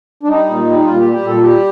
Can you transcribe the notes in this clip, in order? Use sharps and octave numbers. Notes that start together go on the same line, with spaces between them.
D4
G3 D#4
A#2
G3
D#4
A#2 F4
G3 G4
G4
A#2 A4
G3 G4